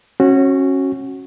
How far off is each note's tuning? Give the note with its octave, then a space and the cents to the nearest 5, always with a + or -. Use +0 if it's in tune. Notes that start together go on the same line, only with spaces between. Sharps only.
C#4 -25 F#4 +0